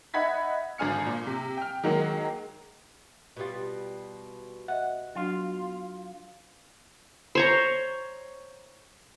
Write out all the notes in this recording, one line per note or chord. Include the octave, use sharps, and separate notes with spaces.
D#4 E5 F#5 B5 G#6 B6
G#1 D3 G#5 F6 C#7
A#2
C3
G5 F6
D#3 F#3 G#3 A#3
B2 G3 F4 B4
D#5 E5 F#5
F#3 D4 F4 F#4
C5 C#5 A#5